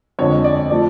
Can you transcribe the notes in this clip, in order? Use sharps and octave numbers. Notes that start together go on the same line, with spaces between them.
F2 D3 G#3 C#5
D5
F3 A3 D5